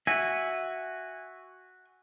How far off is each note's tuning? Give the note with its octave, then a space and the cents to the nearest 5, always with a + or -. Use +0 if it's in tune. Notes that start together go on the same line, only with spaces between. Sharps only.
F#4 +0 E5 +0 G#5 -15